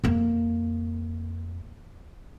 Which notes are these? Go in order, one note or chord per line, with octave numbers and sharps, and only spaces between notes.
F2 A#3